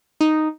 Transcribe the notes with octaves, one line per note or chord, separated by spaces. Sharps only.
D#4